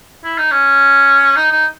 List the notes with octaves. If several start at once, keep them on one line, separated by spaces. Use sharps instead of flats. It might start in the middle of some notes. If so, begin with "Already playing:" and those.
E4
D#4
C#4
D#4
D#4